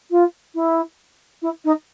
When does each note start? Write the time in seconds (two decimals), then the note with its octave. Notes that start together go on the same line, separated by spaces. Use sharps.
0.10 F4
0.54 E4
1.42 E4
1.64 D#4